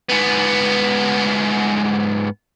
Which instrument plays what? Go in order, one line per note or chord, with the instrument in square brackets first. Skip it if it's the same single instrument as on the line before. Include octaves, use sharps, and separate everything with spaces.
[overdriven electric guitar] G#2 B3